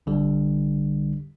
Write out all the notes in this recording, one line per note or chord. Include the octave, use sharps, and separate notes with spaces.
A#1 D3 G3